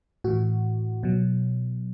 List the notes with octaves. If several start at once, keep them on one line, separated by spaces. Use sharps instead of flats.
A2 E3 F#4
B2 F#3